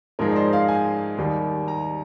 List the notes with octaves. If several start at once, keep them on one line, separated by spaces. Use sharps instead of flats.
G#2 F3 G#3 A#4
D5
C5
F5
G#5
D#2 D#3 G3
A#5